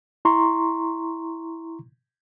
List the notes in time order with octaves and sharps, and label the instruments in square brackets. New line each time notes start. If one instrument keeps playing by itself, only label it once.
[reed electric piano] E4 A#5 C6 C#6